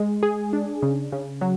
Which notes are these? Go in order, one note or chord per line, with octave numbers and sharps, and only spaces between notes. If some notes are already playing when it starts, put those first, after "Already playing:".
Already playing: G#3
G#4
D4
C#3
C#3
F#3